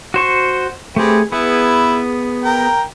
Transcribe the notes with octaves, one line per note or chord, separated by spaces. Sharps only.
F#4 C5 C#6
A3 C4 G4 G#4 B4
B3 E4 G#4 B4
A#4 G5 A#5